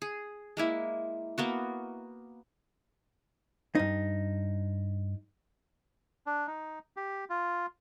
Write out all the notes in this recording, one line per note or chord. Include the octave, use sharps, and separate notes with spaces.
G#4
G#3 A#3 E4
A#3 B3 F#4
G2 D#4
D4
D#4
G4
F4